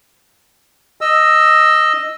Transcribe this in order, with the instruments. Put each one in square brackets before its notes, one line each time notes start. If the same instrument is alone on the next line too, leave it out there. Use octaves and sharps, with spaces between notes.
[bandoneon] D#5 E6